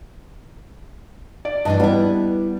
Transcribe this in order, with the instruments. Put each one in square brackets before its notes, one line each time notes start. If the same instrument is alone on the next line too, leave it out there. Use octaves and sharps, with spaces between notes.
[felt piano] D5
[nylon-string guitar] G2 E3 D4 [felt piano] D#5 A5
[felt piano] G3 D4 [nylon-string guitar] B3 E4